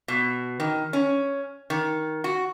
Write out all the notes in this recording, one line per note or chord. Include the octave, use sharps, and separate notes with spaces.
B2
D#3
C#4
D#3
F#4